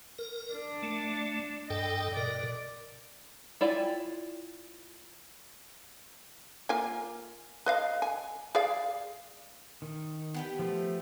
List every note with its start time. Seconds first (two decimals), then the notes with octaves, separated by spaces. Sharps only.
0.19 A#4
0.53 D4
0.83 A3
1.70 G2 A4 D#5 G5
2.17 B2 A#4 D5
3.61 E4 F4 D5 G5 G#5
6.69 A#3 F4 G#5
7.66 B4 D#5 F5
8.02 G#5
8.55 G#4 D5 F5
9.82 D#3
10.34 B3 G4 B4
10.59 F3 A3 F4